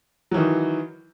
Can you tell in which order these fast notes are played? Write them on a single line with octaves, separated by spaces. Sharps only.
F#3 E3 D#3